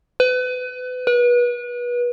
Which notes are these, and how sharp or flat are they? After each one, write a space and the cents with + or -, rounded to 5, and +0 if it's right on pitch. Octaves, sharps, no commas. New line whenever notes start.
B4 +30
B4 -30